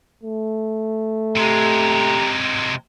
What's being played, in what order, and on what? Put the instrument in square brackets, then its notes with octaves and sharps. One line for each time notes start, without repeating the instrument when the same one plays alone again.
[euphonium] A3
[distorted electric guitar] C3 G#3 [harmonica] G4 A#5